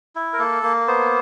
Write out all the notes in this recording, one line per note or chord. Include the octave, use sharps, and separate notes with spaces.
E4
A#4
A#3 A4
A#3
B3 C5